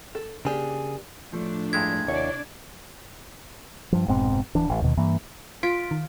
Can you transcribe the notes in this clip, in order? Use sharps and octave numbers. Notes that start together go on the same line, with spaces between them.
A4
C#3 A#3 D4 G4 G#4
A2 F3 A3 D4
G2 G#3 E4 G#6
D#2 C3 D4 E4 C#5 D5
G2 F3
F1 G#2 B2 C4
D1 E3 D4
A1
D#2 B2 D#3
G2 E3 A#3
F4 C6 B6 D7
D#3